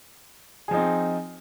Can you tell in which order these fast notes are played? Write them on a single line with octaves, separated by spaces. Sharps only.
G#4 F3 D#4 C4